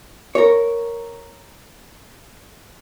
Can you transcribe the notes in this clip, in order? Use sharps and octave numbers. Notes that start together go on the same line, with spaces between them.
A#4 C#5